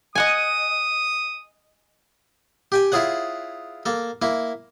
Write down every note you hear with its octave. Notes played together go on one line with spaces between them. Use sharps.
D#5 F#5 G#5 D#6
G4 G5 G#5
E4 F4 G#4 C#5 F#5
A#3 A4
A#3 E4